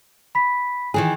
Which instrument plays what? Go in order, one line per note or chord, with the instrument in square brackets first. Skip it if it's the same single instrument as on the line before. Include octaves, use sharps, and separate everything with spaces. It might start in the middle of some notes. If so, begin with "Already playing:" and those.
[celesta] B5 B6
[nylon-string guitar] D#3 E3 G#4